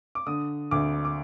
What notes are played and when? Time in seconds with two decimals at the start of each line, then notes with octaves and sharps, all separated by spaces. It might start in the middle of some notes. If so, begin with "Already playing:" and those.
0.15 D6
0.27 D3 D#6
0.71 D2 D6
1.05 D6